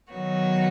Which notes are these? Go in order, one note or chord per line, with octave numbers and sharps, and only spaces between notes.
D#3 F#3 B3 F#4 C#5